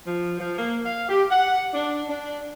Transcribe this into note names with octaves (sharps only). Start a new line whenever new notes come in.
F3
F3
A#3
F5
G4
F#5
D4
D4